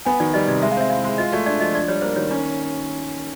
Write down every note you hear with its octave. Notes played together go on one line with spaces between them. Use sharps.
B3 G#5
D#3 D5
G3 D#5
C3 D5
G#3 E5
F5
C4 E5
E4 F5
G#3
F4 D#5
A3 D5
D4 D5
F3 D#5
D4 D5
G3 C#5
A#3 C5
D#3 C#5
C#4